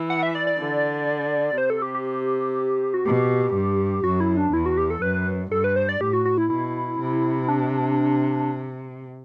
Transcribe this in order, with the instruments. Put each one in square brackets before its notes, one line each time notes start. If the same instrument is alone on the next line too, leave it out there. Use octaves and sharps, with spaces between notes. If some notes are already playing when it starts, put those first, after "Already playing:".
Already playing: [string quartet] E3
[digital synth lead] F#5
E5
D5
D5
[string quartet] D3
[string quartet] C3 [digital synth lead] C5
[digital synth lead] A4
G4
G4
F#4
[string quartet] B2 [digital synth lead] G4
[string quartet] G2
[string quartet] F#2 [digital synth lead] F#4
[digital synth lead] E4
D4
[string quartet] E2 [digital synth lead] E4
[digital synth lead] F#4
G4
A4
[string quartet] F#2 [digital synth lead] B4
[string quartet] G2 [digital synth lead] A4
[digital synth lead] B4
C5
D5
[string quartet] A2 [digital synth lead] G4
[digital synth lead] F#4
F#4
E4
[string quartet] B2 [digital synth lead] E4
[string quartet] C3
[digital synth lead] D4